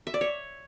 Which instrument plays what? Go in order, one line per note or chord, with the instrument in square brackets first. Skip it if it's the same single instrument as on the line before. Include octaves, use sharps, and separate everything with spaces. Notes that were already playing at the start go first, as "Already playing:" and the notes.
[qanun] E5
D5
C#5